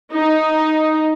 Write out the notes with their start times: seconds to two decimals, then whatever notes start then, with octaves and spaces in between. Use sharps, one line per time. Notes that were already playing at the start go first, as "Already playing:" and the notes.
0.12 D#4